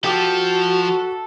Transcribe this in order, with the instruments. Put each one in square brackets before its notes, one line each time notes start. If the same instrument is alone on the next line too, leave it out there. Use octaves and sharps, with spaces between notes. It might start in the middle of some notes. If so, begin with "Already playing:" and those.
[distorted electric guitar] F3 [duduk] F#4 [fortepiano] G4 D6 [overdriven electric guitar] A4